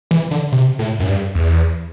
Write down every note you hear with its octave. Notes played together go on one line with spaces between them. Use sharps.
E3
D3
C3
A2
F#2
G2
E2